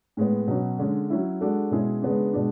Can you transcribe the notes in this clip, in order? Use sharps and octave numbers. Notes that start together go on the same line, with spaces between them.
A2 G#3 B3
B2 F#3 C#4
D3 G#3 C#4
F#3 C#4 E4
G#3 D4 F#4 A4
B2 G#3 C#4 E4 G#4
C#3 G#3 B3 D4
B2 G#3 D4